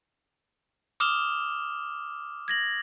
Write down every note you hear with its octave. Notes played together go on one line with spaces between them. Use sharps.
D6 D#6 F6 E7 F7 G7
G#6 A#6 F#7